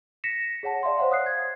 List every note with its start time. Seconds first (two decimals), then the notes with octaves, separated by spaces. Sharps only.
0.24 A#6 B6 C#7 E7
0.63 G#4 C#5 F#5 A5
0.83 D5 E5 F5 C6
0.98 C5 C#5 F5 F#5 C6
1.11 F5 D#6 F#6 C7
1.26 G#6